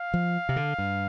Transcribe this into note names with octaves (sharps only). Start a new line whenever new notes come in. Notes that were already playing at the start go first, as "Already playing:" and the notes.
Already playing: F5
F3
C3
D3
G2